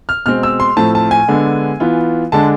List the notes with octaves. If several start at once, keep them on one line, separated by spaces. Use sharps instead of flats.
F6
B2 G#3 C4 F6
E6
C6
A2 F3 A3 C4 A5
A5
G#5
D3 G#3 B3 D4
E3 B3 F4
D3 G#3 D4 A5